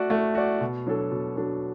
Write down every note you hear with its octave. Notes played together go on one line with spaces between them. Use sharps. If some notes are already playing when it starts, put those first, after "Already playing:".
Already playing: A3 F#4 D5
A3
F#4 D5
B2
F#3 D4 A4
B2
F#3 D4 A4